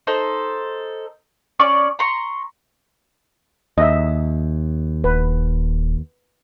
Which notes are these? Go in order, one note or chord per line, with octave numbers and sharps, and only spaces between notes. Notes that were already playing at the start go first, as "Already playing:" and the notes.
D#4 A4 C5
C#4 D5 C#6
A#5 C6 C#6
D#2 D#5 E5
D#1 B4